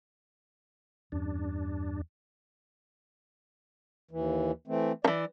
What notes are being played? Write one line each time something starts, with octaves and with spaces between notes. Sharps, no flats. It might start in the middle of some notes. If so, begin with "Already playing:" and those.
E2 G2 C#4 D4
D#2 E3
E3 A3 C4
D#3 E3 D5